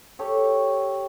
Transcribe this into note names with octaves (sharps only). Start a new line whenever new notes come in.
G4 A4 C#5